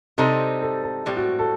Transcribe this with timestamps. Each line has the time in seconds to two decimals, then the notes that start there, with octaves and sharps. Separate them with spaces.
0.18 C3 G3 C4 D#4 A4
0.62 A4
0.83 A4
1.06 A2 G3 C4
1.17 F#4
1.39 A4